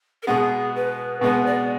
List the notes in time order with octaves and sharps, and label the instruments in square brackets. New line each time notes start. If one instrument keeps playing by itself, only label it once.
[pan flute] A#4
[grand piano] B2 G#3 B3 [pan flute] G#4
[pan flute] B4
[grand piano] B2 G#3 B3 [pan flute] B4
[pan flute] D5